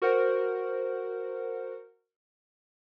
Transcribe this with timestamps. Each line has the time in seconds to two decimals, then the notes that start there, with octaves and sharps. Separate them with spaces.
0.02 F#4 A#4 C5 F#5